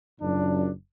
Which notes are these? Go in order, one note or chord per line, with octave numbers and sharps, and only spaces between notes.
F#1 F#2 A#2 D4